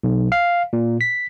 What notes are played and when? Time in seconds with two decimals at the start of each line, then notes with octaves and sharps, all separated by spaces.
0.04 B1
0.32 F5
0.73 A#2
1.01 B6